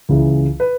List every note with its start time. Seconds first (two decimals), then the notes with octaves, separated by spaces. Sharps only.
0.09 C#2 C#3 E3
0.60 B4